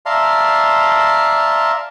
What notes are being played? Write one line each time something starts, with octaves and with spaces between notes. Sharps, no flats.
D5 E5 F5 A5 A#5 C6